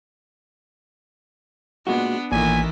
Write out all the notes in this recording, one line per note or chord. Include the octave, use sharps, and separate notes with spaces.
A#2 G#3 B3 D4 F#4
A1 A#2 D#3 E3 G#5 B6